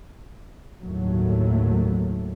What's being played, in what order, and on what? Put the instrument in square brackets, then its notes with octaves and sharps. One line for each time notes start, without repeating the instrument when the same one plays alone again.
[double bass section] G1 D#2 A2 F#3 A3